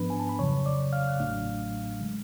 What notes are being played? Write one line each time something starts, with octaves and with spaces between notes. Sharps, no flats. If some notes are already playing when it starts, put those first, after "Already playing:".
Already playing: G#2 F3 B3 D4 B4 B5
G#5
A5
B5
F2 C#3 F#3 C#5 C#6
D5 D6
F5 F6
F#6
A1 A2 F#3 A3 D4 F5 F6
D3 G#3